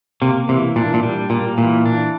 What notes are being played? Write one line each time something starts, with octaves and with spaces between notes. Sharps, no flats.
C3 A#3
C3 E3
A#2 D4
A#2
G3
A#2 A#3
A#2 E3
D4